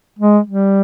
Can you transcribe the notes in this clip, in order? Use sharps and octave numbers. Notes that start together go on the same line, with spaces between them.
G#3
G3